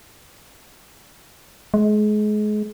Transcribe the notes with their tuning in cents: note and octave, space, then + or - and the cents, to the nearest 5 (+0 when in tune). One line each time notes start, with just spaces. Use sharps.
G#3 +30